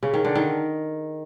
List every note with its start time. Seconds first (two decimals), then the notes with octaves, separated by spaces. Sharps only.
0.03 C#3
0.14 D#3
0.25 D3
0.35 D#3